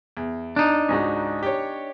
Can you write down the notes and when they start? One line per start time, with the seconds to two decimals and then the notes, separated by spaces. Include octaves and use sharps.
0.17 E2
0.56 D4 D#4
0.89 C#2 G#2 F#4
1.43 G4 C#5